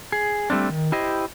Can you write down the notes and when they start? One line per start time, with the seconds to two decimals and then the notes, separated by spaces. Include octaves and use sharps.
0.12 G#4
0.50 G3 A3 C4 D4
0.70 D#3
0.92 E4 G4 C5 D#5